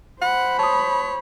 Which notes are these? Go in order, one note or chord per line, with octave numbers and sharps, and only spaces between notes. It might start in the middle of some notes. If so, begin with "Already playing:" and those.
C5 F#5 B5
C#5 A5 D#6